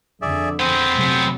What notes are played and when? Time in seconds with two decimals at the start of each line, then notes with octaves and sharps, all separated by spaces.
0.22 F2 D3 G#4 D5 E5
0.60 B3 C4 G#4 C5 G5
0.93 C3 F#3 A3